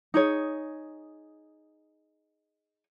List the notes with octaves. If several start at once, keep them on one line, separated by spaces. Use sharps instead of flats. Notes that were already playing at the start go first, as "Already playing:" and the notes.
D#4 G#4 C#5